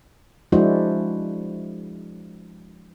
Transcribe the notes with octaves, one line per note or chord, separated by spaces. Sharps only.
F3 G#3 D4 E4 F#4 C5